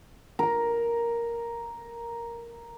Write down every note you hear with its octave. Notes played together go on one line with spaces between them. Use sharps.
A#4 A#5